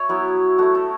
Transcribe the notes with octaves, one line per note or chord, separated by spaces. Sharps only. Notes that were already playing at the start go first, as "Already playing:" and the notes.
Already playing: C#5 E5
F#3 B3 E4
A3 E4 F#4
A4